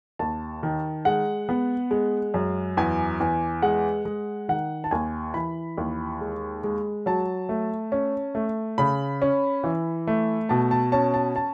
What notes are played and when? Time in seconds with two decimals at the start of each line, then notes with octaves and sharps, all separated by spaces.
0.19 D#2 A5
0.63 D#3
1.05 G#3 F#5
1.49 B3
1.91 G#3
2.34 F#2
2.77 E2 G#5
3.20 E2
3.62 G#3 F#5
4.05 G#3
4.49 D#3 F#5
4.84 A5
4.91 D#2 G#5
5.34 E3 B5
5.78 D#2
6.21 G#3
6.64 G#3
7.06 F#3 A5
7.49 A3
7.92 C#4
8.35 A3
8.78 C#3 B5
9.22 C#4
9.64 E3
10.07 A3
10.49 B2 A5
10.71 A5
10.92 C#4 A5
11.14 A5
11.36 A5